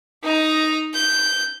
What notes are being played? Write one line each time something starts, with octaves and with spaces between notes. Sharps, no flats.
D#4 A#5
G6